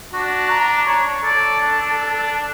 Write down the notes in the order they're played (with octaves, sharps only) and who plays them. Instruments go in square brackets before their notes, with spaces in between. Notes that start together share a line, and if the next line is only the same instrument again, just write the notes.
[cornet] D4 [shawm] F#4
[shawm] A#5
C#5
[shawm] A4 [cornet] D5
[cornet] D4